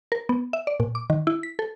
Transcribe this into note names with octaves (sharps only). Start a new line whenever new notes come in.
A#4
B3
E5
D5
A#2
D6
D#3
E4
B6
A4